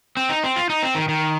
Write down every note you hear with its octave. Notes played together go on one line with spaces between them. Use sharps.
C4
D#4
C4
F4
D#4
C4
D#3
D#3